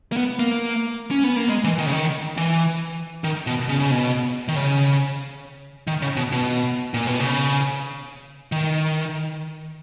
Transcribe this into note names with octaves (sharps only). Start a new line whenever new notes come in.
A#3
B3
A#3
C#4
B3
A#3
G#3
E3
D#3
C#3
D#3
E3
D#3
B2
C#3
C#3
B2
D#3
C#3
D#3
C#3
B2
B2
A#2
B2
C#3
D#3